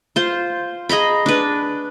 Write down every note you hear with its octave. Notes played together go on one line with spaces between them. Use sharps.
F4 C5
G#4 D#5 A#5 B5
D4 B4